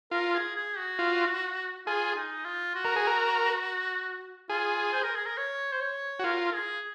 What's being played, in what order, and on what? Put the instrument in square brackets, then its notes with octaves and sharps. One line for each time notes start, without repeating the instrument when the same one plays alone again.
[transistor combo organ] F4 [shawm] A#4
[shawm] G#4
G#4
F#4
[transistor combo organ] F4
[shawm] F4 [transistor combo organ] G#4
[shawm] D#4
F4
F#4
[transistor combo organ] A#4
G#4
A#4
[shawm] F4 [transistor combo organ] G#4
[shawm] C5
A#4
G#4
A#4
C#5
C5
C#5
[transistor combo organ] F#4
[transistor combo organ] F4 [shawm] A#4
[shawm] G#4